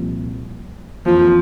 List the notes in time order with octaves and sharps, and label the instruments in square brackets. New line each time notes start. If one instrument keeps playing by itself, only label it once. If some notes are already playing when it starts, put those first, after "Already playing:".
Already playing: [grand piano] C2 A#2 F3
[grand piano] F2 E3 A#3 [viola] F3